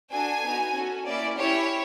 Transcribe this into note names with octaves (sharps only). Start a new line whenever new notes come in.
D4 F#4 A4 G#5
B3 D#4 F#4
C#4 F#4 A4
A#3 C#4 E4 D5
C#4 E4 G4 C#5